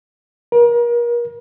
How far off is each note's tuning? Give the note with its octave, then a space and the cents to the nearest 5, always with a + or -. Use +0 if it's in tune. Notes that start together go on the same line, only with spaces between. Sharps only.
A#4 +35